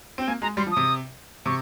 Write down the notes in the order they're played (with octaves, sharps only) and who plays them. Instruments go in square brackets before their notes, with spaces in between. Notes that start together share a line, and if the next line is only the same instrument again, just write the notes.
[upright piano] C4 [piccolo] G5
[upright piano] A#3 [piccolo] G#5
[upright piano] G#3 [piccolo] A#5
[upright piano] G3 [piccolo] C6
[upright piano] F3
[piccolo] D#6
[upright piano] C3
[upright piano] C3 [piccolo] C#6